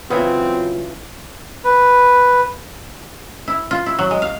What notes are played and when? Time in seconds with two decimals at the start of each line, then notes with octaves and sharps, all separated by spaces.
0.10 C#3 E3 F#3 B3 C4 F4
1.65 B4
3.48 E4
3.71 F4
3.86 E4
3.99 F#3
4.11 G#3
4.22 F5